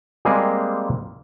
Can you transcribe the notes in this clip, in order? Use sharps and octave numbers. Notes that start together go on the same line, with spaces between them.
G3 G#3 A#3 C4 G#4 A#4